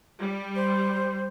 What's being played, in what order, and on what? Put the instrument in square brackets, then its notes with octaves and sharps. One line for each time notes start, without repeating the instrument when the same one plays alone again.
[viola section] G3
[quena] C5